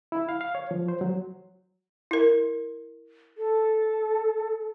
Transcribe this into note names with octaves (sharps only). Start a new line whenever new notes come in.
E4
F5
F5
C#5
F3
C5
F#3
E4 A#4
A4